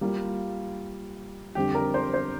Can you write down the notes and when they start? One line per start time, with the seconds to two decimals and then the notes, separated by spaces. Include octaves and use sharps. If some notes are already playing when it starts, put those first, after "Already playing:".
0.01 G3 A#3 F4
1.55 F2 D3 G3 C4 G4
1.75 A#4
1.94 C5
2.14 C5